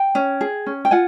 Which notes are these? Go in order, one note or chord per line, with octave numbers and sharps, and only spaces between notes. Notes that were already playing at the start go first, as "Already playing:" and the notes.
Already playing: G5
C#4
G#4
C#4
G5
F4 F#5 G#5